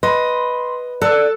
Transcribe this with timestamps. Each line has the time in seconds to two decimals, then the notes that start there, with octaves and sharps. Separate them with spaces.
0.03 B4 D#5 B5 C6
1.02 A4 D5 E6 F#6